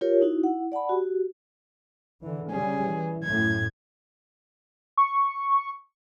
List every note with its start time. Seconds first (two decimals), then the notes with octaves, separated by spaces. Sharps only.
0.01 F4 G4 A#4 C#5
0.21 D#4 E4 F#4
0.44 E4 F#5
0.72 D5 F#5 A5 B5
0.89 F#4 G4
2.22 D3 E3
2.51 C#3 G3 C#4 G#4
2.84 E3
3.24 F#2 A2 G#6
4.97 C#6